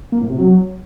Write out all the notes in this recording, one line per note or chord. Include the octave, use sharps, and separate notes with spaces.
A#3
A2
C3
F#3